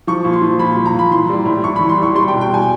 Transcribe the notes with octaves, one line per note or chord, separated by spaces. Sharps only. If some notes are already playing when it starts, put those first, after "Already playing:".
F3 C#6
A#2
C6
F3
A#2 B5
F3
A#5
A#2
B5
E3 C6
G3
A2
A2 C#6
B5
E3
C6
G3 C#6
G3 C6
G5
B2
G5
G3 G#5